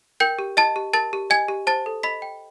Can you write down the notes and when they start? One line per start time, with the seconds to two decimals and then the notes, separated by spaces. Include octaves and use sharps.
0.20 A#4 G5 G6
0.39 G4
0.57 D#5 A5 A6
0.76 G4
0.93 A#4 A5 A6
1.13 G4
1.30 D#5 G#5 G#6
1.48 G4
1.67 C5 A5 A6
1.86 A4
2.03 D#5 B5 B6
2.22 G5